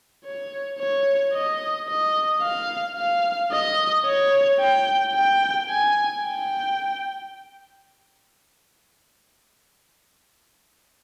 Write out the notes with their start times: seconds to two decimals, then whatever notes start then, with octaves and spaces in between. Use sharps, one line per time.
0.25 C#5
0.79 C#5
1.33 D#5
1.88 D#5
2.42 F5
2.97 F5
3.52 D#5
4.06 C#5
4.60 G5
5.15 G5
5.69 G#5
6.23 G5